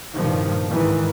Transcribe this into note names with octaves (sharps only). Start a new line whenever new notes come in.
C2 G2 A#2 D#3 F3
G#2 D#3 E3